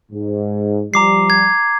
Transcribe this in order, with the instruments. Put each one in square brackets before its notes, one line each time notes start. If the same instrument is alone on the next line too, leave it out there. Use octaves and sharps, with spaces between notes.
[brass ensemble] G#2
[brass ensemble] F3 G3 [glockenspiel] A#5 D6 C7
[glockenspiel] G#6